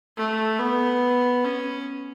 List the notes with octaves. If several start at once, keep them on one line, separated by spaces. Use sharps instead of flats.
A3
B3
C#4